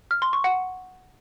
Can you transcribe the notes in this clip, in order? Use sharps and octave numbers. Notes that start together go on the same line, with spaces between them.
F6
C6
C#6
F#5